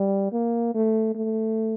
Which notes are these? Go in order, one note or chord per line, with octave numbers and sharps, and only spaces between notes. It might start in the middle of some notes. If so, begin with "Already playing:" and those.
Already playing: G3
A#3
A3
A3